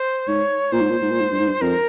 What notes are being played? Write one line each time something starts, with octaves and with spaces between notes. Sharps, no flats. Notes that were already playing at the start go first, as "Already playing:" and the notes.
Already playing: C5
G#2 C#5
A#2 C5
G#2
A#2
G#2
A#2
G#2
G2
G#2
G2
F2 A#4